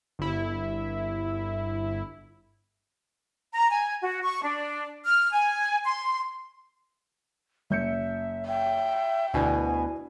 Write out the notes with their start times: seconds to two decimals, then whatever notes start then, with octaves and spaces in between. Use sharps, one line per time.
0.19 G1 E4
3.53 A#5
3.71 G#5
4.02 F#4
4.23 C#6
4.43 D4
5.05 F6
5.32 G#5
5.85 C6
7.70 F#1 E5 G6 C#7
8.48 E5 G5
9.34 D2 B2 D4 E4 G#5